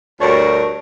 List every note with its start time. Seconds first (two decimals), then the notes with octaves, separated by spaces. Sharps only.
0.19 D2 G2 D4 F#4 A#4 C#5